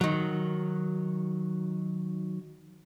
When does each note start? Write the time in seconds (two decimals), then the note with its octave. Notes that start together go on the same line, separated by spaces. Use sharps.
0.01 D#3 F#3